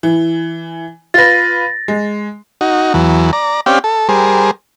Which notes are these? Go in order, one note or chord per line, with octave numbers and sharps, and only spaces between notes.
E3
F4 B4 A6 A#6
G#3
D#4 F#4
E2 E3 F#3
D5 A#5
C4 C#4 G4 D5 F5 G5
A4
G3 G#4 A#4 C5